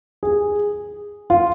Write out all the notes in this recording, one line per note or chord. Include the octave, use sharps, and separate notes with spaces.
G#4
F4